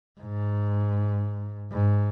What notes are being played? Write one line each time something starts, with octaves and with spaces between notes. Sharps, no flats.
G#2
G#2